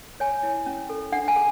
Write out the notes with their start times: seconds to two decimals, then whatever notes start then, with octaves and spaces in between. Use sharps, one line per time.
0.20 C#5 G#5
0.43 E4
0.66 C#4
0.89 A4
1.12 D4 F#5
1.28 G#5
1.36 G#4